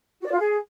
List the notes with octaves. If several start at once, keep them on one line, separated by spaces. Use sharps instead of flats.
F#4
D5
F4
G#4